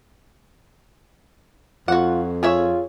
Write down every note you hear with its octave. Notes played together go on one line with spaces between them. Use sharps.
F2 F4 F#4 F#5
F4 G#4 C#5 E5